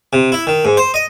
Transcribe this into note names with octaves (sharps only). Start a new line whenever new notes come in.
C3
E4
D#3
G#2
C5
D#5